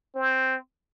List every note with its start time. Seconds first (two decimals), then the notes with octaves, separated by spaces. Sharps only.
0.16 C4